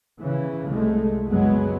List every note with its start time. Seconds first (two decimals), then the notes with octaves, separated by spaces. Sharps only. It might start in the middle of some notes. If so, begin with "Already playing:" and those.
0.19 C#3 E3
0.68 C2 G#3 A3
1.28 F#1 B2 F#3 G#3 B3